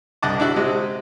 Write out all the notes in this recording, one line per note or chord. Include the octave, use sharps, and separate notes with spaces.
C2 D#5 F#5 A5 D6
D4 E4 F#4
C3 G#3